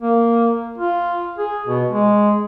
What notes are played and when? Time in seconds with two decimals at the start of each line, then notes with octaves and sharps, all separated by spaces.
0.02 A#3
0.78 F4
1.38 G#4
1.67 B2
1.91 G#3